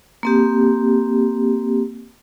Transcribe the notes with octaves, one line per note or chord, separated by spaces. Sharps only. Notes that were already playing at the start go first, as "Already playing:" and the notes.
A#3 C4 G4